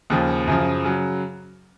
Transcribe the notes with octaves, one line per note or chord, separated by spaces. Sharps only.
D#2 C#3 F3
F#2 C#3 F3
C#3 F#3